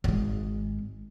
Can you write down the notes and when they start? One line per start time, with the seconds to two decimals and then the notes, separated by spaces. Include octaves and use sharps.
0.04 G#1 G#3